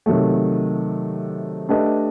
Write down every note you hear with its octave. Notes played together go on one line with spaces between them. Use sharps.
C3 D#3 F#3 A3
A3 D4 G4 B4 D#5